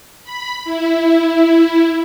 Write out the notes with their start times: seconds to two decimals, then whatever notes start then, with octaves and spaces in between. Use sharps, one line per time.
0.24 B5
0.64 E4